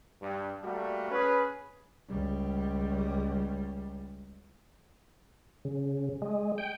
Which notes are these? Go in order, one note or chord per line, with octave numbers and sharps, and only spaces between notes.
G2
G3 A3 A#3 F#4
C#4 G#4 B4
C#2 G3
C#3
G#3
G5